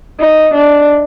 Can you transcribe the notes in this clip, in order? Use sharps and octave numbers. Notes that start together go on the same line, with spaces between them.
D#4
D4